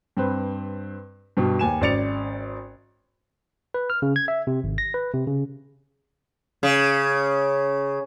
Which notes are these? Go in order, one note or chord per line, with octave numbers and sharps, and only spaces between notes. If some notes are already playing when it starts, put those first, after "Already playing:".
G2 C4 B4
G2 B2
D#2 G#5 E7
G#1 C#4 D5 A6 C#7 F7
B4
F6
C#3
G#6
E5
C3
G#1
A#6
B4
C3
C#3
C#3